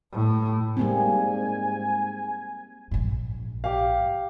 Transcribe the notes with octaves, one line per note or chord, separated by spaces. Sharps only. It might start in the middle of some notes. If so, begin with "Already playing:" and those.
A2
G#2 G3 A#3 C4 G#5
A#1 G#2
G4 F5